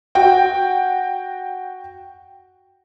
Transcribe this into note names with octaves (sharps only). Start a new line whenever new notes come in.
F#4 G5